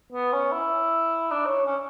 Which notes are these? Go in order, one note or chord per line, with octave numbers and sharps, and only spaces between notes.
B3
C#4
E4
D4
C#5
C#4